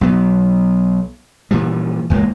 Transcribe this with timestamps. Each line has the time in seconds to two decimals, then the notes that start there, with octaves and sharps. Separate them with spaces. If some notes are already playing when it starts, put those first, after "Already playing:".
0.01 B1 F#3 B3
1.51 A#2 E3 F3 G3
2.10 D#1 D#2 G#3 A#3